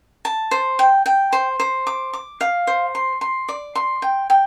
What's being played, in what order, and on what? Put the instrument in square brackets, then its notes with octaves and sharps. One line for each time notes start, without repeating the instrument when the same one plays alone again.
[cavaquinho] A5
C5
G5
G5
C5
C5
D6
D6
F5
C5
C6
C6
D5
C6
G5
G5